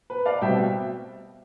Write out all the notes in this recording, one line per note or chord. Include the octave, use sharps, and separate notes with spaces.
B4
D5 F5
B2 G3 C4 E5 G5